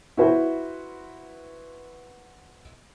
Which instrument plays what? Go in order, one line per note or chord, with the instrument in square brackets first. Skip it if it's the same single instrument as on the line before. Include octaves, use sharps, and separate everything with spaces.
[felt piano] E4 F#4 B4 C5